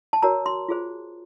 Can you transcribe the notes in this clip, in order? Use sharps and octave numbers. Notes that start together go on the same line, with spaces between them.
A5
F#4 A#4 C#5 A#5
C6
F4 G#4 C5